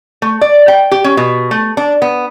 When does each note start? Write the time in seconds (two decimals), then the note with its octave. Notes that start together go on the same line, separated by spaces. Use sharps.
0.22 A3
0.41 D5
0.68 G5
0.91 G4
1.04 C#4
1.17 B2
1.51 A3
1.77 D4
2.02 B3